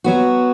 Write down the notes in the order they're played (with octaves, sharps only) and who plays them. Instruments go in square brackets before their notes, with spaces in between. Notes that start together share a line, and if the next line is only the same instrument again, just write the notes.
[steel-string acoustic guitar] F#3 B3 F#4